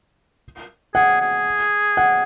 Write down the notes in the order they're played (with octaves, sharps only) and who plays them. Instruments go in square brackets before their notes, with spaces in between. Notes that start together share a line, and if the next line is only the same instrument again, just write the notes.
[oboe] G#4 [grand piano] F#5
[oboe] G#4
[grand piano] F#5